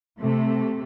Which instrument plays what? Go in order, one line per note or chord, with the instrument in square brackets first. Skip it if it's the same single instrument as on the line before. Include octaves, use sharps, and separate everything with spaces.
[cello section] C3 A3